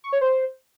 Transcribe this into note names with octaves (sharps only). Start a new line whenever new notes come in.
C#6
C#5
C5